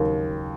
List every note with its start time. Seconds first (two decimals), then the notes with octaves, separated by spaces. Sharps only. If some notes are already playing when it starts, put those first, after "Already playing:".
Already playing: D#2 C#3 F#3